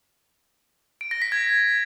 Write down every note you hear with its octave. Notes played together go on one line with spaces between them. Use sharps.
D7
A#6
B6
G#6